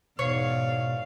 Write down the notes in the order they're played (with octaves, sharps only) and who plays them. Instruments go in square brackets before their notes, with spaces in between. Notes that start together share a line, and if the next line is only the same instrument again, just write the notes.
[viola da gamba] E2 G#2 D5 [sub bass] B2 [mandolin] C#5 [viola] F5